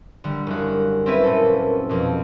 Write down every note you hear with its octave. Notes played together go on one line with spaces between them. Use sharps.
D3 G3
F#1 F#4
C4 C#4 E4 B4
A#2 A4
F2 B2